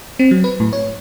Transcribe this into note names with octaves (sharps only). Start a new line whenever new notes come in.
C4
F#3
B4
A2
C#5